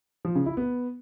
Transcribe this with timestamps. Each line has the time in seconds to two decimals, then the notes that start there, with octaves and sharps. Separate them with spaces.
0.25 F3
0.35 C#3
0.46 E4
0.57 B3